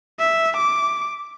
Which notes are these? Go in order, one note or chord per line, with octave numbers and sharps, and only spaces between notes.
E5
D6